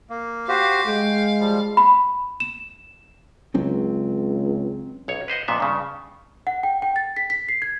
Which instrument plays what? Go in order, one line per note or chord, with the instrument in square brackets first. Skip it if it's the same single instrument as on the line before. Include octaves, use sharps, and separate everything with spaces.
[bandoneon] A#3
[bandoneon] F#4 G4 C5 [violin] F5
[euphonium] G#3 [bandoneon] G5
[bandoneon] F3 G3
[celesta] B5
E7
[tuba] C#2 [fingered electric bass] F#3 C4 C#4
[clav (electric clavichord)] B1 C#5
B4 C5 D#5 F#5
F2 A#2 B3 E5
G2 C#3
[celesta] F#5
G5
G5
A6
B6
B6
C7
G#6